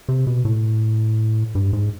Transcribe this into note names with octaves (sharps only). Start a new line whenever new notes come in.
C3
B2
A2
G2
G#2